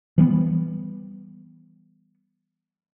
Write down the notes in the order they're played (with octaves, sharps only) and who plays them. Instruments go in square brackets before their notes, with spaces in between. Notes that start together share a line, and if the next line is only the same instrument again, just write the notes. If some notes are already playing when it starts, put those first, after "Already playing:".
[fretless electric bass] E3 G3 B3